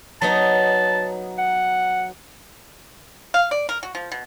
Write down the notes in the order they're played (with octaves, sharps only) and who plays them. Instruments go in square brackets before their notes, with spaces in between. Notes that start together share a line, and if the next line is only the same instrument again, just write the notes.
[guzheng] F#3 B3 D#4 [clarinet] A5
[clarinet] F#5
[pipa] F5
D5
A#4
F#4
F3
B2